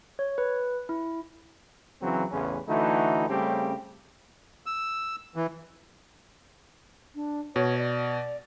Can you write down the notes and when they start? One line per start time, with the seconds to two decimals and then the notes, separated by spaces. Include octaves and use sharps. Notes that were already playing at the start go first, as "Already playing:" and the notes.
0.19 C#5
0.38 B4
0.89 E4
2.02 C#3 E3 F#3 C4
2.32 A1 E2 C#3 C#4 B4
2.69 D3 E3 A3 D#4 E4 F#4
3.30 C#3 G3 A3 C4 C#4 G4
4.66 E6
5.36 E3
7.15 D4
7.56 B2 C#5
7.78 D5